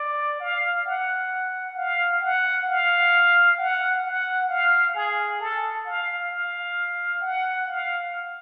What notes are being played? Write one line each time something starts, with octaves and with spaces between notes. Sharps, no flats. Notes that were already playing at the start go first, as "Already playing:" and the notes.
Already playing: D5
F5
F#5
F5
F#5
F5
F#5
F#5
F5
G#4
A4
F5
F5
F#5
F5